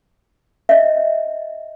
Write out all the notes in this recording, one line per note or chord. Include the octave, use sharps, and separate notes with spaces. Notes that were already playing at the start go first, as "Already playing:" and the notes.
D#5 E5